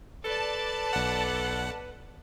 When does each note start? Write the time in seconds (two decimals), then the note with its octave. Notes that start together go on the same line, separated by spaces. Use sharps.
0.24 A4 B4 D5 A5
0.93 B1 F#5